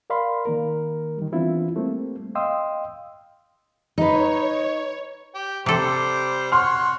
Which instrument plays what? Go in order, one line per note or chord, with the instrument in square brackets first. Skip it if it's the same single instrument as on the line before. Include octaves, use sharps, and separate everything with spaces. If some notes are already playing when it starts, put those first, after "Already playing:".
[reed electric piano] A#4 D5 F5 B5 C6
D#3 A#3 A#4
D#3 G3
E3 B3 C4 D4 E4 F4
G3 A3 A#3 C4
D#5 F5 G5 C6 D#6 E6
[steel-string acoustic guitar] D#4 [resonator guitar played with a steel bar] B4 D#5 [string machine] C#5
[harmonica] G4
[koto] C3 A4 [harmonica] G3 C5 D6
[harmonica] F#4 C#5 [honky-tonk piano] C6 F6